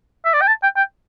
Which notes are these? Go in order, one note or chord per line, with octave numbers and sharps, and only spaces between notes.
E5
D5
G5
A5
G5
G5